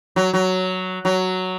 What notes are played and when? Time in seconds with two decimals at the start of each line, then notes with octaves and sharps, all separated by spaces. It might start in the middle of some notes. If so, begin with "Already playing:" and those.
0.16 F#3
0.33 F#3
1.05 F#3